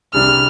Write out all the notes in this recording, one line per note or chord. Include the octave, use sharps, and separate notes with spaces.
C2 C3 G3 D4 G#4 F6